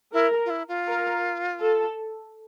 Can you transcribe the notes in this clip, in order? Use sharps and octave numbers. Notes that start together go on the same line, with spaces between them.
E4 A#4
F4
E4
F4
A#4
A4